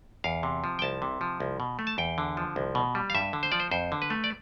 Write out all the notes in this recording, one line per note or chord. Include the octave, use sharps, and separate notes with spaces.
E2 F5
C3
F3
G5
C2 A5
C3
F3
C2
B2
A3
A5
E2 G5
D3
F3
C2
B2
G3
F5
G2 E5
D3
C5
F3 D5
C5
F2 C5
D3
B4
A3
D5